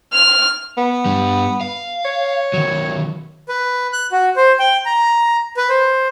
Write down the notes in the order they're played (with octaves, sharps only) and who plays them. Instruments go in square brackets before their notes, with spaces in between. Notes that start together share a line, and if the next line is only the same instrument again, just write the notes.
[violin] F6
[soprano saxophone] B3
[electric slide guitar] G2 G3
F5
[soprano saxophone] C#5
[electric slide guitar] D#3 F#3
[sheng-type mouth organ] B4
F#6
F#4
C5
G5
A#5
B4
C5